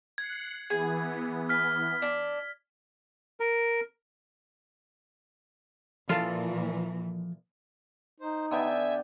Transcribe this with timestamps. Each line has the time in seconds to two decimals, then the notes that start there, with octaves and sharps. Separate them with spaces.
0.18 F#6 G#6 C7 C#7
0.70 E3 B3 G#4
1.49 F6 B6
2.02 D4
3.40 A#4
6.09 A#2 E3 F3 F4 A4 A5
8.20 D#4 C5
8.51 D3 B3 E5 G5 G#5 E6